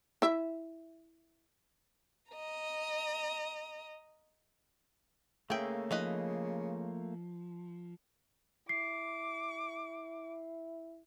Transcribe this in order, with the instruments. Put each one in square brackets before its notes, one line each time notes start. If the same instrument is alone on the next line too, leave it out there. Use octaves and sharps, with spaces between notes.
[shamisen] E4 E5
[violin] D#5 A#5
[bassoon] C#3 [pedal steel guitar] A3 A#3 [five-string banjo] G#4 E5 G5
[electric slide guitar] F3 [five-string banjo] D#4 B4 D#5
[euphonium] E4 [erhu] D6 [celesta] C7